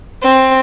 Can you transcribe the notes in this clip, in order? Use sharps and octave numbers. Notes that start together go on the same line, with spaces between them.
C4